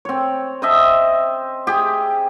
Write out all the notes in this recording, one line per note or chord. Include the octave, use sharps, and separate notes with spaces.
C4 C#5
C5 D#5 E5 A5
G4 G#4